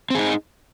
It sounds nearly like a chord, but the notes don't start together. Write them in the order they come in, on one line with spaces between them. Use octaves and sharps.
C4 G#4 D#4